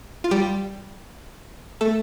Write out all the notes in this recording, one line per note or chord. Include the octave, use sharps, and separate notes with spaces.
F4
G3 G4
A3 A4